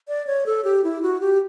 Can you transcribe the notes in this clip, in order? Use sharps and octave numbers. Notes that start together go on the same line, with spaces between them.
D5
C#5
A4
G4
E4
F#4
G4